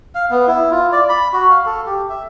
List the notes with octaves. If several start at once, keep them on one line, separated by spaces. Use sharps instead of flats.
F5
B3
E4
F4
D5
B5
F#4
F5
A4
G4
E5